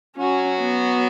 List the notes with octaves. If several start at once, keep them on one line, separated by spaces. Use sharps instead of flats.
F#3 C#4 F#4
B3